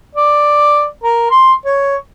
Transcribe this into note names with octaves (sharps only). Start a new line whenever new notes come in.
D5
A#4
C6
C#5